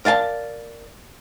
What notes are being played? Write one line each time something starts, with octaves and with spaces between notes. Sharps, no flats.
A#4 D5 F5 G#5 A5